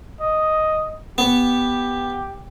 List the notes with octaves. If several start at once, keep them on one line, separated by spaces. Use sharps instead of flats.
D#5
B3 G4